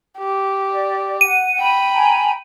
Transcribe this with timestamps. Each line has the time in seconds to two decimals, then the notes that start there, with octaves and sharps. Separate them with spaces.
0.18 G4
0.72 D5
1.21 F#5 D#7
1.59 G5 B5
1.93 G#5 A#5